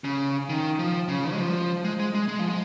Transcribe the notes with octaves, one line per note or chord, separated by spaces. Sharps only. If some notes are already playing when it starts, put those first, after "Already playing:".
C#3
D#3
F3
C#3
G#3
F3
G#3
G#3
G#3
G#3
F3
G#3